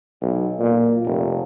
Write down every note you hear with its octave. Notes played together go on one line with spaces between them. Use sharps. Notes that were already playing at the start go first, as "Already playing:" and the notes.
B1
A#2
F1